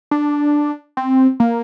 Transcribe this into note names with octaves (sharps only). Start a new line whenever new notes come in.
D4
C4
A#3